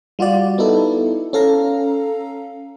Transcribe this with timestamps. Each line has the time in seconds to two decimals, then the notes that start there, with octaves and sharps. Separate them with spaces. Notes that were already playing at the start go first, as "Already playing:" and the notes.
0.19 G3 F4 F#4 D5
0.58 B3 D#4 E4 A4
1.33 C#4 A4 F5 A#5